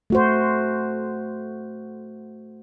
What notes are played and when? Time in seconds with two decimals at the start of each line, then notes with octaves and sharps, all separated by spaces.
0.10 A3 F#4 C5